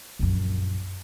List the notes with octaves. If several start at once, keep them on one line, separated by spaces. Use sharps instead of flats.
A#1 F#2